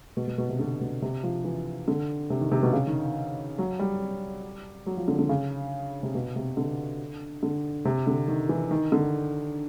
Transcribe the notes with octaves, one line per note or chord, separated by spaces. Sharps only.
B2
B2
B2
C3
D3
B2
C3
F3
E3
D3
C3
D#3
C3
B2
C#3
D#3
F#3
G3
F#3
F3
D3
D3
C#3
C3
B2
C3
D3
D3
C3
D3
D#3
E3
D#3
D3